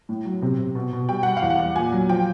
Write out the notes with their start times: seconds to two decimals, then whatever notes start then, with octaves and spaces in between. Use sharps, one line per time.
0.09 A2
0.25 F#3
0.42 C3
0.59 C3
0.75 B2
0.93 B2
1.09 G3 G5
1.23 G3 F#5
1.37 F5
1.42 E2
1.50 F#5
1.59 E2
1.76 A#2 G#5
1.93 F#3
2.09 F3 G5